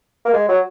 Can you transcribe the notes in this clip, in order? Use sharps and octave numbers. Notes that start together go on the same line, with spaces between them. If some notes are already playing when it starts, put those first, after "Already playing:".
A#3
G#3
F#3